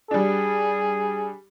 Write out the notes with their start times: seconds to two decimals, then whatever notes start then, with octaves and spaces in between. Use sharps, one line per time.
0.11 G3 D4 G#4